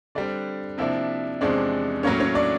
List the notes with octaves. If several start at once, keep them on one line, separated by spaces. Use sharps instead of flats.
D3 G3 C4 D4 D5
C3 F3 A#3 D4 E4 E5
E2 C3 F3 G#3 C#4 D4 D5
A2 F#3 A#3 C#4 C#5
C#4 C#5
D4 D5